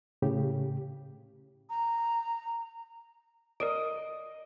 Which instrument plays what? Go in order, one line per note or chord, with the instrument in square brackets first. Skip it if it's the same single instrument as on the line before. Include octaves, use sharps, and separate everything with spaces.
[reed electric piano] A2 C#3 G4
[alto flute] A#5
[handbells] A#4 D5 D7 [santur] D#5